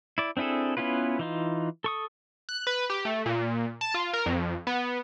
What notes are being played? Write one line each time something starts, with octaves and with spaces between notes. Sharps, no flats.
E4 D5
C4 D4 E4 G#4 A4
B3 C#4 E4 F4 B4
E3 D#4 F4
A4 C#6 D#6
F#6
B4
G4
A3
A#2
A5
F4
A#4
F2
B3